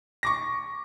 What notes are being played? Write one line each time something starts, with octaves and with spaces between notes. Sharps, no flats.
C#6 D6 A#6